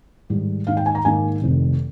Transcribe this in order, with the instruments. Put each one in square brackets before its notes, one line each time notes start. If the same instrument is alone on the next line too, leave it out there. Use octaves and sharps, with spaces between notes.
[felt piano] G#2 D#3 G3
G#2 D#3 A#3 D#4 F5
G5
G#5
A#5
G#2 D#3 A#3 D#4 G#5
F1 F2 D#3